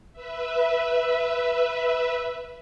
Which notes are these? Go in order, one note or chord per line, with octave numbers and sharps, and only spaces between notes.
B4 E5